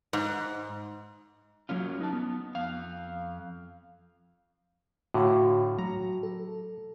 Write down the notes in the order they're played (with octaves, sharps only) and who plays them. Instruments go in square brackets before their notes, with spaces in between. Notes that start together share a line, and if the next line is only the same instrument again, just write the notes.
[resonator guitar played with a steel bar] G#2
[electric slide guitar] F#3 A#3 C#4 F4
D#4 A5
B3
F2 F5
[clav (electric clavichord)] A2 D3 [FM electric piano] F#4 F5
[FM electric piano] F#3 [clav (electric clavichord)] A#5
[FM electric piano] A4